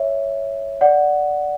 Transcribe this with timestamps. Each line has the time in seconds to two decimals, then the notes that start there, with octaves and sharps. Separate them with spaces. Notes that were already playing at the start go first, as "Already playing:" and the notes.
Already playing: C#5 E5
0.81 D5 F#5